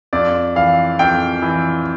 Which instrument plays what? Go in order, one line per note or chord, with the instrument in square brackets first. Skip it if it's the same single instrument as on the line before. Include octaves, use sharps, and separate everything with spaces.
[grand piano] F2 D5
E3 F5
F2 G5
E3